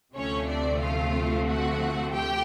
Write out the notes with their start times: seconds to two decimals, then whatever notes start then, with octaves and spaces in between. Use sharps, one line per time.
0.15 D2 C3 F3 A3 C4 C#4 C#5
0.48 D4 D5
0.81 F4 F5
1.47 F#4 F#5
2.12 G4 G5